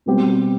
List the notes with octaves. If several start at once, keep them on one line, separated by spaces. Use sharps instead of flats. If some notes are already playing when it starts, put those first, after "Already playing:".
B2 G3 C4 G4